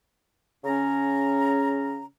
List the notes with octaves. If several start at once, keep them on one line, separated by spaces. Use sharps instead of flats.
C#3 C#4 A#5